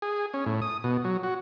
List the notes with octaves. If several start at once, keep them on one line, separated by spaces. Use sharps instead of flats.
G#4
C#4
A2
D#6
B2
F#3
F#4